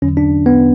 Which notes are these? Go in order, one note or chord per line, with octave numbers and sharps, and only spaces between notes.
E2 D3 F#3 C#4
D4
B3